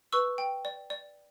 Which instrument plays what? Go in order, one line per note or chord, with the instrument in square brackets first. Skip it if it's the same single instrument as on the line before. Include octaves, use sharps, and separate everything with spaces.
[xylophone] B4 C#6 E6
G5
D5
D5